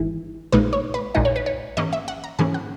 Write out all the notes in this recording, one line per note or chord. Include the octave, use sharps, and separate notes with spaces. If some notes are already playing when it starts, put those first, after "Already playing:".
Already playing: G#1 G#2 E3
A#1 A#2 G#3 D#4 B4
C#5
B4
A#1 A#2 G#3 D#4 D#5
C#5
B4
C#5
G#2 E3 A#3 C#4 D#5
E5
F#5
A#5
G#2 E3 A#3 C#4 G#5
F#5